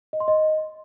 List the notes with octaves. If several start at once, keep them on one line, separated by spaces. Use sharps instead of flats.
D#5
C6
D#5